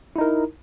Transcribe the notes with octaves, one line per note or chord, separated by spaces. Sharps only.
D#4 E4 A#4